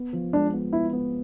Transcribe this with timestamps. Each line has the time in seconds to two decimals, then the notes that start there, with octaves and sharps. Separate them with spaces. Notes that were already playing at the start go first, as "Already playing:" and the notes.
Already playing: B3
0.13 F3
0.33 G#3 D4
0.53 B3
0.73 B3 E4
0.93 B3